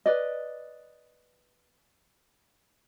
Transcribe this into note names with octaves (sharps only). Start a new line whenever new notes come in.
B4 D5 D#5